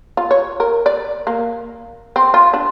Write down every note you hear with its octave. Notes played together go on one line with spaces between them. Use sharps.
F4
C#5
A#4
D5
A#3
C4
F4
D4